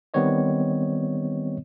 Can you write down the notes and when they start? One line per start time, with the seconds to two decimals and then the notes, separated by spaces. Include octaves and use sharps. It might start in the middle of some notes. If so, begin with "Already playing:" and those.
0.14 D#3 G3 B3 C4 C#5 D#5